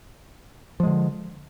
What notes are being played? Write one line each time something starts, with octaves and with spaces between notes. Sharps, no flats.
D3 F3 G#3